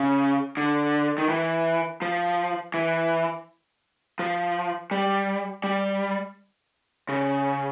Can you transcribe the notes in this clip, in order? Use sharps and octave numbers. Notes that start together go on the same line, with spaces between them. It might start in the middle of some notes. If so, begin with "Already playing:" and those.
Already playing: C#3
D3
D#3
E3
F3
E3
F3
G3
G3
C#3